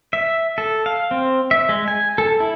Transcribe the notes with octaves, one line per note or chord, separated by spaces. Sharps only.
E5
A4
F5
C4
E5
G#3
G#5
A4
E4